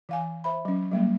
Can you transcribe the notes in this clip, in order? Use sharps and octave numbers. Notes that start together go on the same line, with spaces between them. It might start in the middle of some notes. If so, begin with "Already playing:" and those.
E3 F5 G#5
C5 E5 B5
F#3 C#4
F#3 G3 A#3